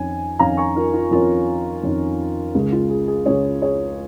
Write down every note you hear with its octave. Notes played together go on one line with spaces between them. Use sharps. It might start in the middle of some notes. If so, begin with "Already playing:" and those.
Already playing: F2 D#3 C#4 G#5
F2 D#3 C#4 F5 A#5
G#5 C#6
F4 A#4
F4
F2 D#3 C#4 F4 A#4
F2 D#3 C#4
C#2 C#3 G#3
F4
G#4
G#4
C#2 C#3 G#3 G#4 C#5
G#4 C#5